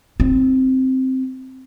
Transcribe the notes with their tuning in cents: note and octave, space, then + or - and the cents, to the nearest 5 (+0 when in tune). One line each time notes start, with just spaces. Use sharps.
C4 +0 D#4 +0